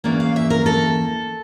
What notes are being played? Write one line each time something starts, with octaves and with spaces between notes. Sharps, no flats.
E2 E3 A#3 C#4 D5
F5
E5
A#4
A4